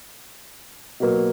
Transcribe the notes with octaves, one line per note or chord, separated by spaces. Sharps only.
B2 F#3 A#3